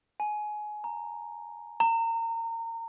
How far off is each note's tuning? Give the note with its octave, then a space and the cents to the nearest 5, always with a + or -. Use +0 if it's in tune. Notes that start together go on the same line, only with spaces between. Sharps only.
G#5 +20
A#5 -5
A#5 -30